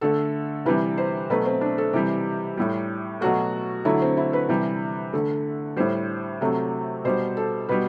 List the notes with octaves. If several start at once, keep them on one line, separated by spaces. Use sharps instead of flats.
D3 A3 A4
C3 E3 G3 B4
C5
B2 F#3 A3 B4
C4
D4
A4
C3 E3 G3 G4
A2 G3
B2 F#3 A3 F#4
D3 F#3 A3 E4
C4
E4
B4
C3 E3 G3
D3 A3
A2 G3 C5
C3 F#3 A3
B2 G3 C5
A4
B2 G3 B4